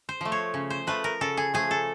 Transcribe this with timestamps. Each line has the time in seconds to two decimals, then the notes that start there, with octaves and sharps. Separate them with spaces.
0.09 C5
0.21 F3 A3
0.32 C#5
0.54 C#3
0.70 C5
0.87 F3 A3 B4
1.04 A#4
1.21 C#3 A4
1.37 G#4
1.54 F3 A3 G#4
1.71 A4